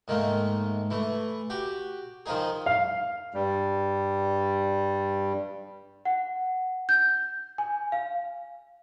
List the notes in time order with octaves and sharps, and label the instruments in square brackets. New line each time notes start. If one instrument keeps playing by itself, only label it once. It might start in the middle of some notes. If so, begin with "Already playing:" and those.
[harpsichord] G#2 D#3 A3 A#3
E3 A3
F#4 G4
D#3 F3 D#4 G#4
[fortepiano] F5
[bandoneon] G2 G3
[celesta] F#5
G6
G#5
F5